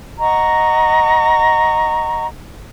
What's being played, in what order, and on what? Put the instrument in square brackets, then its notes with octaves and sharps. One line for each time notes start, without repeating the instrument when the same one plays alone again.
[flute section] D#5 F#5 A#5 C#6